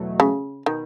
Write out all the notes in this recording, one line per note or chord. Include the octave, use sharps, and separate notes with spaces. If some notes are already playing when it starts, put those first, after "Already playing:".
Already playing: E2 B2 F#3 A3
C#3
B2 D#3